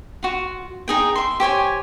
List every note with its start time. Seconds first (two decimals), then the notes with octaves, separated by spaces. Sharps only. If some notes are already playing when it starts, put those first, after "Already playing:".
0.23 F4 F#4
0.88 D#4 G#4 G5
1.16 E5 C6
1.40 G4 C5 C#5 G#5